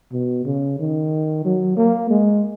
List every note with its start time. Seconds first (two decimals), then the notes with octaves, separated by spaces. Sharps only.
0.12 B2
0.45 C#3
0.79 D#3
1.45 F#3
1.77 A#3
2.10 G#3